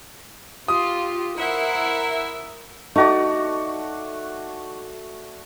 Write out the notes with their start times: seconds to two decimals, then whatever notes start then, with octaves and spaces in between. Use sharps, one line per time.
0.68 F4 G4 D#6
1.38 E4 A#4 C5 E5 F#5
2.96 A3 D#4 F#4 D5